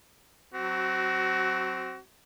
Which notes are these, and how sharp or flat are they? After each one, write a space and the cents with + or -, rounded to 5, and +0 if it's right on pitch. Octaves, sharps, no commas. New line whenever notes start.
F#3 +0 C4 +0 F#4 +25